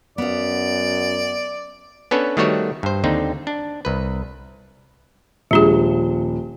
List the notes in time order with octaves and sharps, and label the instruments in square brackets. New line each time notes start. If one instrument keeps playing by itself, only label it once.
[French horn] F#2 [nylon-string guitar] B3 F5 [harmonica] D5
[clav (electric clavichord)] B3 C#4 D4 A4 B4 C#5
D#3 G3 A3 B3 F#4 C#5
G2 C5
D#2 D3 C4 D#4
D4
C2 B4
[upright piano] D#1 F3 [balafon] G#3 D4 G#4